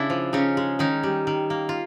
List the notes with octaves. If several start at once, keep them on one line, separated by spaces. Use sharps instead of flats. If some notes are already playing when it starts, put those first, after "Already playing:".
Already playing: C#3 D4 E4
F3
C#3 C#4 D#4
G#3
D#3 C#4 D#4
G3
D#3
A#3
F4